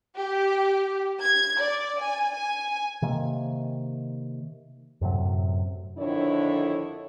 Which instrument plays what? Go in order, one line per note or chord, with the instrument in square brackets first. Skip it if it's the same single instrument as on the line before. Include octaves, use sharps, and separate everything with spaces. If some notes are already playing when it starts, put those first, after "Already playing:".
[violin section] G4
G#6
D5
G#5
G#5
[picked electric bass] C3 D#3 A#3
F#2 A2 C3 F#3
[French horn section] F2 D3 D#3 D4 E4 C#5